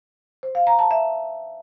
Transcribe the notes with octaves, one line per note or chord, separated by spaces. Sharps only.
C5
F5
A#5
A5
E5